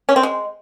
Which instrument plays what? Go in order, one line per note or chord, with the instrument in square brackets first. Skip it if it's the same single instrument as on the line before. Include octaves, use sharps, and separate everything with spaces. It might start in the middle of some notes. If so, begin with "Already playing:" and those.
[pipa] C#4
C4
G#3